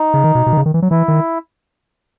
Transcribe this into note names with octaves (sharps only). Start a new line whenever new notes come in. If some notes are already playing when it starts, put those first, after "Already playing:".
Already playing: D#4
C#3
D#3
B2
B2
D#3
C#3
D#3
E3
F#3
E3 E4
D#3